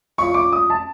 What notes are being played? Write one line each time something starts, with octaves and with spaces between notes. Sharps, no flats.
A#2 F3 G#3 C#4 E4 C#6
D6
D#6
A5